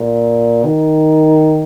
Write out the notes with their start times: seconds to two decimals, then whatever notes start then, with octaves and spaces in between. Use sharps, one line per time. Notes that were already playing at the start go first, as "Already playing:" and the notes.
Already playing: A#2
0.65 D#3